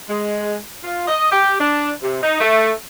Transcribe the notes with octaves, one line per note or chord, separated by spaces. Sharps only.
G#3
F4
D#5
G4
D4
C3
D#4
A3